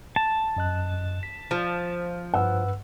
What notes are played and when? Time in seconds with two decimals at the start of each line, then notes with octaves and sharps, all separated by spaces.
0.16 A5
0.56 F#2 D#5 F#6
1.23 B6
1.51 F3
2.34 G2 B4 F#5 E6